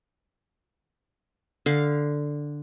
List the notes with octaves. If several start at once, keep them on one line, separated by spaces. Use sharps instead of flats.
D3 F5